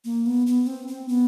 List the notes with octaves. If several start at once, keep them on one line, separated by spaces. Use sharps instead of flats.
A#3
B3
B3
C4
C4
B3